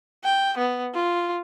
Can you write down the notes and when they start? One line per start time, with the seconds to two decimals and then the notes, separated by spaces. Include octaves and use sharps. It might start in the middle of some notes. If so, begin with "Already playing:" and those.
0.24 G5
0.58 B3
0.95 F4